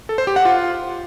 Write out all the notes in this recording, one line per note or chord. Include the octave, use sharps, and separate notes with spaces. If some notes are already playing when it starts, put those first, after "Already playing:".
A4
C5
G4
F#5
F4